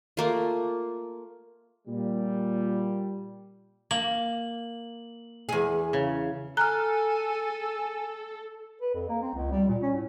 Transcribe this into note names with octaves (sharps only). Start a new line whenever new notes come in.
A3 A#3 F4
A#2 G3
A#3 F#7
E2 G#4
C#3
A4 G#5 A#5 F6 F#6
B4
F2
A#3
C4
C#2
G3
A#2
C#4
A2